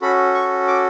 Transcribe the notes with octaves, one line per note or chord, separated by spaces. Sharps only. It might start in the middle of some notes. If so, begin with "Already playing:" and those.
C#4 F#4 A4 B5
C#6
D6